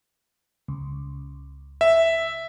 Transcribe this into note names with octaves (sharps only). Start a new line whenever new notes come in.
C#2
E5